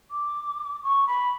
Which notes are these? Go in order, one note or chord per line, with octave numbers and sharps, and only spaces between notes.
D6
C#6
B5